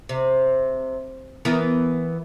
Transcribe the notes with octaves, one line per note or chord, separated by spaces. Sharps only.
C3
E3 B3 A#4